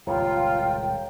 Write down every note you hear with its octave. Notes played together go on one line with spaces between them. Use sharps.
D#1 C#2 C3 F4 C#5 F5 G5 A#5